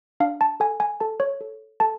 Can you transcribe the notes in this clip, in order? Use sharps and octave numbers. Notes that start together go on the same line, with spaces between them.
D4 F5
A5
A4 G#5
G#5
A4 A5
C#5
A4
A4 A5